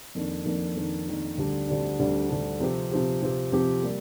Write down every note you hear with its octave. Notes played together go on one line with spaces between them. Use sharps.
F2 D#3 A#3 D4
F2 D#3 A#3 D4
F2 D#3 A#3 D4
F2 D#3 A#3 D4
D2 D3 G3 D4
D2 D3 G3 D4
D2 D3 G3 D4
D2 D3 G3 D4
C3 F3 C4 G4
C3 F3 C4 G4
C3 F3 C4 G4
C3 F3 C4 G4
G3 A#3